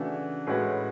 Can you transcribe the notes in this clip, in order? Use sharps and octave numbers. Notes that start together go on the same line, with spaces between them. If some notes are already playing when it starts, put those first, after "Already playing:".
Already playing: C#3 E3 A3 D4 F#4
A2 G#3 C#4 F#4 B4